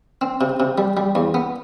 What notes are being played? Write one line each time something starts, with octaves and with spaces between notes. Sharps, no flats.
C4
C3
C3
G3
G3
E2
B3